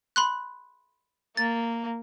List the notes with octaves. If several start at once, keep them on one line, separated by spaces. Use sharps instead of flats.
B5 C6 F#6
A#3 A6